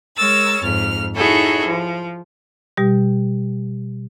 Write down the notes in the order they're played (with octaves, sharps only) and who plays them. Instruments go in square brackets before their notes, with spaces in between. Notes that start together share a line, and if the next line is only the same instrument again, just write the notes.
[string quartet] G#3 A#4 C#5 E6 A6
F2 G#2 F6
D#4 E4 F#4 G#4 A4 C#5
F3
[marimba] B2 G3 G4